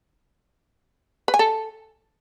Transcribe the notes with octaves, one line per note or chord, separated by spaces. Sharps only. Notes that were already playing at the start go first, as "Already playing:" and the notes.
B4
G#5
A4